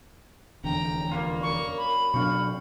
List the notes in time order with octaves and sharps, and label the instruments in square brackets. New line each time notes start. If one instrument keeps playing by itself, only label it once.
[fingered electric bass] F1 E2 D3 [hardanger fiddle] G5 A#5
[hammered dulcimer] G2 F4 [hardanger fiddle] A#3
[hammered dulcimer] F#2 [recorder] C#6
[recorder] B5
[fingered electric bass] B2 F#3 D4 [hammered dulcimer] F5 G5 C#6